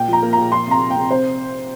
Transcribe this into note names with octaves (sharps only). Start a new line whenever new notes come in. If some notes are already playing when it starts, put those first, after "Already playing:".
Already playing: A#2 G5
F3 A#5
A#3
A#2 A#5
F3 C6
C3 A#5
C3
G5
C3
C3 C5